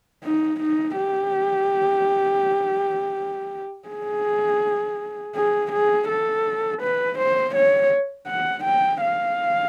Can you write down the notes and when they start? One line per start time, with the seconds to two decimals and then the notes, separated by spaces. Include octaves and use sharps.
0.24 D#4
0.61 D#4
0.97 G4
3.89 G#4
5.36 G#4
5.72 G#4
6.09 A4
6.82 B4
7.19 C5
7.55 C#5
8.28 F#5
8.64 G5
9.02 F5